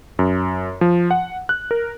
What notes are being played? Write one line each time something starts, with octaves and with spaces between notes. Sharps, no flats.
F#2
F3
F#5
F#6
A#4